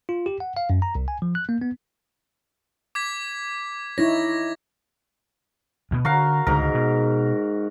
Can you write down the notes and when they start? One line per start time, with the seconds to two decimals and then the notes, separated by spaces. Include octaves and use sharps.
0.09 F4
0.26 G4
0.40 F#5
0.57 F5
0.70 F#2
0.82 A#5
0.95 C2
1.08 G#5
1.22 F3
1.35 F#6
1.49 A#3
1.62 B3
2.95 D6 G#6 B6
3.98 D#4 E4 C#5 G#6 A#6
5.91 D2 B2 B3
6.05 D3 F#4 A#4 F5
6.47 C#2 G#2 D3 A#4
6.75 B2